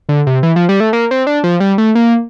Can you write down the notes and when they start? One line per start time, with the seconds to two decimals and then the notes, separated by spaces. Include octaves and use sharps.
0.09 D3
0.27 C3
0.43 E3
0.56 F3
0.69 G3
0.80 A3
0.93 A#3
1.11 C4
1.27 D4
1.44 F3
1.60 G3
1.78 A3
1.95 A#3